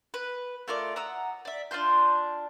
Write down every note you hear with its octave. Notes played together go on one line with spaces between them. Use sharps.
B4
A3 F4 A#4 D5
F#5 A#5 D#6 E6
D5 E5
D4 F4 C6 G6